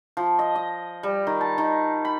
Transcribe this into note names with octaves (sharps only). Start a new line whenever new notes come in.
F3
D#5
D#5
G3
D#3
A5
D#3
B5